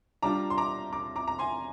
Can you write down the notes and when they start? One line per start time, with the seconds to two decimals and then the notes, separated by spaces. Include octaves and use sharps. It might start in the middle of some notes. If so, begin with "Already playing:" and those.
0.22 G3 D4 F4 A#5 D6
0.50 C6
0.58 A#5 D6
0.93 A#5 D6
1.16 A#5 D6
1.28 A#5
1.39 G#5 C6